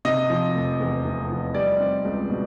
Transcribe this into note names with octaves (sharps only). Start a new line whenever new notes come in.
C3 D#5
F3
F1
E2
C3
F3
G3 D5
C4
C#2
B2